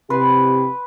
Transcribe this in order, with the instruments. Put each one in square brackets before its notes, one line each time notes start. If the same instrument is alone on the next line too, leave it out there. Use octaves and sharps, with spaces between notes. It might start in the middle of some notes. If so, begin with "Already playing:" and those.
[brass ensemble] C3 E4 G4 [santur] B4 C6